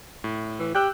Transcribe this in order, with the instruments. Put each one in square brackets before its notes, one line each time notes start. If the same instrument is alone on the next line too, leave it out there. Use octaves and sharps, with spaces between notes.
[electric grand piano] A2
[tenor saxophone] E3
[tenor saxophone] G4 [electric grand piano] E6 F#6 G6